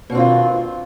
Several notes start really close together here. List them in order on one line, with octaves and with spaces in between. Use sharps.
B2 D4 C4 F4 D#3